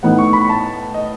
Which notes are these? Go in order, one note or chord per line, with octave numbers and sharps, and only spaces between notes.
A2 E3 B3 D#4 F#5
C#6
B5
A5
D#5